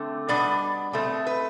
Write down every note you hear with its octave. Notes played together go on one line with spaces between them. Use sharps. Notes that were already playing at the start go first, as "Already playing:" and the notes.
Already playing: D3 A3 C4
B2 G3 B3 D4 D5
B2 A3 C4
B4